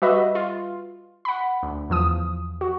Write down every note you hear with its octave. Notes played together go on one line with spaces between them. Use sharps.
G3 F#4 B4 D#5 E5
F4
F#5 B5
D2
E2 F3 D#6
F#4